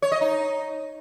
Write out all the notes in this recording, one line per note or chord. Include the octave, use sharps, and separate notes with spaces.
C#5
D#5
D#4